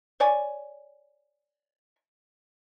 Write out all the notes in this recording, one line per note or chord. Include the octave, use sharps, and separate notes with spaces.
C#5 D5 G#5